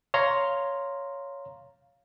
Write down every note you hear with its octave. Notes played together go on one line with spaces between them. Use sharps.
C#5 F5 A#5 C6